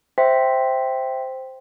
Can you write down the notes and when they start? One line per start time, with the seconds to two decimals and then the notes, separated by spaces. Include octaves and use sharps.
0.18 C5 E5 G5 C6 A#6 B6